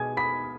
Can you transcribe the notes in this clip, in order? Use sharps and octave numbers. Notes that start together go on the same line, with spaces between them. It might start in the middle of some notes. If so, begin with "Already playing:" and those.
Already playing: B2 G#3 G#4 G#5 G#6
B5 B6